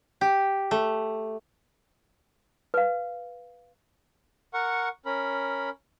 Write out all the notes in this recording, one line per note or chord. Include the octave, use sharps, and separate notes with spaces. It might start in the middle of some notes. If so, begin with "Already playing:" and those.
G4
A3
B4 F5
A#4 F#5 C#6
C#4 A#4 B5